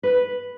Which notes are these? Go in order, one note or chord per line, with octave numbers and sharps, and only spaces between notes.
B4